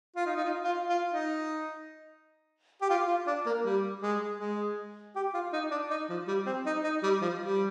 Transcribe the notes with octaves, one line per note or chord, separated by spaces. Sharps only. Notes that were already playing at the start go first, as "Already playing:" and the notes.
F4
D#4
D#4
F4
F4
F4
D#4
G4
F4
F4
D4
A#3
G3
G#3
G#3
G4
F4
D#4
D4
D#4
F3
G3
C4
D#4
D#4
G3
F3
G3